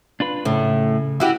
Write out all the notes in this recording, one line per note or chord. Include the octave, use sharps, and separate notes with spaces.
D4 F4 B4
A2 C#3
E4 F#4 G4